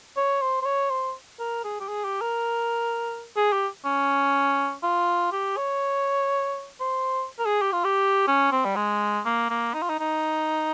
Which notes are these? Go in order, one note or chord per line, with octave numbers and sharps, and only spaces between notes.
C#5
C5
C5
C#5
C5
A#4
G#4
G4
G#4
G4
A#4
G#4
G4
C#4
F4
G4
C#5
C5
A#4
G#4
G4
F4
G4
C#4
C4
G3
G#3
A#3
A#3
D#4
F4
D#4
D#4